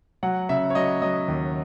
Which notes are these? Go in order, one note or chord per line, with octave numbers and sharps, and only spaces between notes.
F#3 F#5
C#3 E5
C#5
F#3 D#5
F#3 D#5
D#2